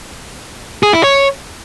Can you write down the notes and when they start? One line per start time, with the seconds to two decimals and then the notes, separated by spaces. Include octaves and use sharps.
0.83 G#4
0.93 E4
1.04 C#5